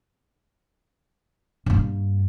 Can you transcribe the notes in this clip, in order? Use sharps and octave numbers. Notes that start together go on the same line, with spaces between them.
G2 A#3